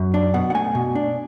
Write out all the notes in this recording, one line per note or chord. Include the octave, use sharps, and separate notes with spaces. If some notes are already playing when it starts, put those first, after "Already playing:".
Already playing: F#2
D4
B2 F#5
F#5
A3 G#5
B2
D4